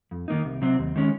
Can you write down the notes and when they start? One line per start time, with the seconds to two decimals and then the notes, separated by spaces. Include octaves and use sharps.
0.11 F2
0.28 D#3 A#3 D#4
0.45 C2
0.62 C3 F#3 C4
0.79 D#2
0.96 D#3 G#3 C#4